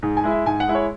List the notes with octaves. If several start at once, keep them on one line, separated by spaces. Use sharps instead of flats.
G#2 G#4
G#5
G#3 E4
E5
G#2 G#5
F#5
G#3 E4
C#5